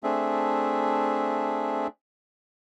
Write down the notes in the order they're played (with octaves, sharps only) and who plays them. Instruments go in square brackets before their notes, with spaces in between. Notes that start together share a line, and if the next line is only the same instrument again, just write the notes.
[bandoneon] A3 C4 D4 G#4 E5